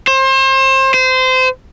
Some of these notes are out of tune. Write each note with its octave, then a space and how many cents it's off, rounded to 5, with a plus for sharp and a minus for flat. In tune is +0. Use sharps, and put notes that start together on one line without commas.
C5 +30
C5 -25